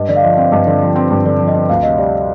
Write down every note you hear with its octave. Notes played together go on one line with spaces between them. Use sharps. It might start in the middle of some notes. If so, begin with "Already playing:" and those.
Already playing: G2 D#5
D3 D5
F5
F3 D#5
C4 F5
G2 D#5
D3 D5
F3
C4
G2
D3 D5
F3
D#5
C4
D2 F5
C3 D#5
G3 D5